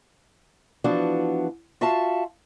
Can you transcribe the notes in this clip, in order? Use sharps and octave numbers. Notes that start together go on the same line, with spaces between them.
E3 F3 B3 D4 F#4
F4 F#4 E5 F5 A5